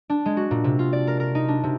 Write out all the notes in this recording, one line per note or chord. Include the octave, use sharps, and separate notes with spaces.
D4
G#3
F#4
A#2
C3
F4
D5
A#4
A#4
D#4
D4
C3